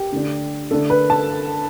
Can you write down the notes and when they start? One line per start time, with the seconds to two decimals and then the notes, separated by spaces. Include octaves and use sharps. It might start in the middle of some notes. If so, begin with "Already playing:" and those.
Already playing: G4
0.12 D3 A3 D4
0.71 D3 A3 D4 A4
0.90 B4
1.10 A5